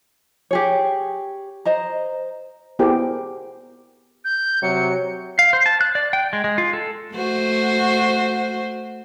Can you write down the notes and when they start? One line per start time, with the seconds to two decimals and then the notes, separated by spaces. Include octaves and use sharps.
0.51 G4 G#4 C#5
1.65 C5 D#5 A#5
2.79 B3 E4 G4 G#4 A#4 C5
4.25 G6
4.63 C3 F#3 C#7
5.39 F5
5.53 C5
5.66 A5
5.81 F#6
5.95 D5
6.13 G5
6.33 G#3
6.44 G#3
6.58 F4
6.73 A4
7.14 A3 F#4 C5